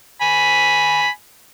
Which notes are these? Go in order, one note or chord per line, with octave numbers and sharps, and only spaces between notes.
G#5 B5